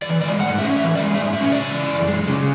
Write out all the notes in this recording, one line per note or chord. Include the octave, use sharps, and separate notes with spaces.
E3 D5
G#3 D5
G#2 F#5
C#4 E5
E3 E5
G#3 D5
G#2 E5
C#4 E5
C#3 D5
E3
F#2
G#3
C#3